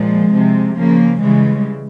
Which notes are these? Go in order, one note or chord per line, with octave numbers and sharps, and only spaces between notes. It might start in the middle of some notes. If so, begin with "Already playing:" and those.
Already playing: A#2 F3 G#3
C3 F3
C#3 F3 A#3
C#3 E3 G3 G#3